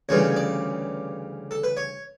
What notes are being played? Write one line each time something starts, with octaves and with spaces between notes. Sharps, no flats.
D2 C#3 E3 G3 C#5
D5
A4
B4
C#5